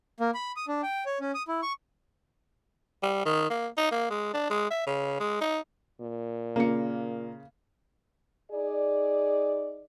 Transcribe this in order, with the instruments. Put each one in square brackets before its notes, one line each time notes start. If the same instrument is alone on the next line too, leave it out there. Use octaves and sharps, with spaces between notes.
[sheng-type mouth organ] A#3
B5
D#6
D4
G5
C#5
C#4
D#6
E4
C#6
[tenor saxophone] G3
D#3
A#3
D#4
A#3
G#3
D4
G#3
E5
C#3
G#3
D#4
[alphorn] A#2
[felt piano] C#3 F4 C#7 [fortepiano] A#3
[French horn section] D#4 G#4 D5